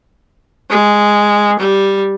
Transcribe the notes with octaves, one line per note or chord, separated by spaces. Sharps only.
G#3
G3